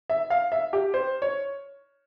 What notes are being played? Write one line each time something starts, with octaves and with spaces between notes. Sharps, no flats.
E5
F5
E5
G4
C5
C#5